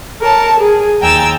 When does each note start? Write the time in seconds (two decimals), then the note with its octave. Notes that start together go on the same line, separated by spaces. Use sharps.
0.21 A#4 C#5 A5
0.59 G#4
1.00 D#2 G5 G#5 A#5 E6 A6